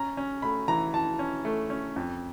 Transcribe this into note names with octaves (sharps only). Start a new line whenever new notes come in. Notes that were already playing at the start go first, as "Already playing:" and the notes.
Already playing: C#4 A#5
C#4
A3 B5
E3 A#5
E3 A5
C#4
A3
C#4
F2